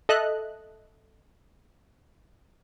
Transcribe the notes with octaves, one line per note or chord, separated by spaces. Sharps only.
A4 D#5 E5 F#6